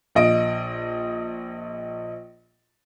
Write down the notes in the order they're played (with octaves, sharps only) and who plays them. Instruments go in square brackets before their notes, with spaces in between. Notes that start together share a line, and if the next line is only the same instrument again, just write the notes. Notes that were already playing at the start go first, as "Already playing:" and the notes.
[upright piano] A#1 D#5 D7